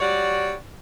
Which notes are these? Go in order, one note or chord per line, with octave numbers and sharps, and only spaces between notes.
G3 F#4 C#5 D5